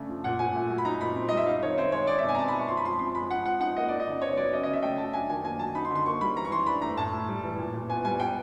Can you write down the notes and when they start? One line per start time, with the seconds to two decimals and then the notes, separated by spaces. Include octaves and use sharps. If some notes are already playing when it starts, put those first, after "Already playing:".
Already playing: C#3 A3 D4
0.09 F3
0.24 A#2 F#5
0.39 A#2 G#5
0.56 A3
0.70 F#3
0.78 B5
0.85 D#4 A#5
1.01 A#2 B5
1.16 C4
1.29 G3 D#5
1.37 E5
1.47 D#4 F5
1.62 D#3 C#5
1.77 C4 C5
1.92 G#3 C#5
2.07 D#4 D5
2.18 E5
2.23 B2
2.29 G#5
2.35 A#5
2.39 C4 A5
2.48 B5
2.53 G#3
2.59 C#6
2.68 F3 C6
2.77 B5
2.84 F3 C6
2.99 C4 C6
3.15 G#3 B5
3.30 F3 F#5
3.45 F3 F#5
3.60 D#4 F#5
3.77 A#3 D#5
3.88 D#4 D5
4.00 D#5
4.07 C#3
4.22 B3 C#5
4.37 F#3 D5
4.52 C#4 D#5
4.63 C#3 D#5
4.73 E5
4.83 A3 G5
4.98 F#3 A5
5.13 D4 G#5
5.29 D#3 G#5
5.44 A#3 G#5
5.59 F#3 A5
5.75 D#4 B5
5.85 C6
5.90 D3
5.95 C6
6.06 A#3 C#6
6.21 G3 B5
6.36 E3 A#5
6.45 C#6
6.51 E3 C6
6.66 D4 B5
6.82 A3 A#5
6.97 A2 A5
7.13 A2
7.28 G3
7.44 E3
7.59 A#2
7.73 A#2
7.88 B3 G#5
8.05 G3 G#5
8.20 B3 G5